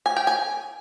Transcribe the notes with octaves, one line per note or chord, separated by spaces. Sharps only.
G#5
G5
G#5